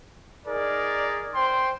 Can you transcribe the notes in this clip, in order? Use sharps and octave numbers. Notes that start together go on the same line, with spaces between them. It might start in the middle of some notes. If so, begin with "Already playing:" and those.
D#4 G#4 A#4 D5
C5 G5 C6